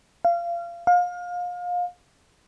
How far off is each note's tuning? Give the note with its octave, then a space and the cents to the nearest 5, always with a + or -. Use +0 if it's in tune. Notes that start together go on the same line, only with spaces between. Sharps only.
F5 -25
F5 +30